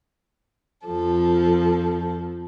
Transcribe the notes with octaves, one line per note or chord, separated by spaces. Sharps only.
F2 F3 A4